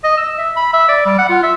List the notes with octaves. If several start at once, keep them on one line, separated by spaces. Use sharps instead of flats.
D#5
E6
E5
B5
E5
D5
G3
F#5
F4
E5